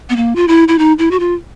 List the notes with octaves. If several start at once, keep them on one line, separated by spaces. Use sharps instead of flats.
B3
A#3
F4
E4
E4
D#4
E4
F#4
F4